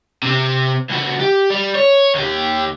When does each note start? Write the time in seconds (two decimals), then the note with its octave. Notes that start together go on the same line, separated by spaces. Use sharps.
0.23 C3 C4
0.90 C#2 F#4
1.20 G4
1.50 G3
1.75 C#5
2.15 D#2 G4